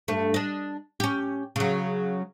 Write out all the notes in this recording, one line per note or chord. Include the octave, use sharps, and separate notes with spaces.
G2 A3
D4 D#5
C#4 G4
C#3 F#3